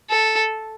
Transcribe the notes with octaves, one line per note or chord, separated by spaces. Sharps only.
A4